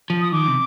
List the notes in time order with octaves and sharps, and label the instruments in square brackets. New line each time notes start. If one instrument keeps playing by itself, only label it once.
[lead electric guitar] F3
[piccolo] D#6
[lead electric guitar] D#3 [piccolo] D6
[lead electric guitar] C3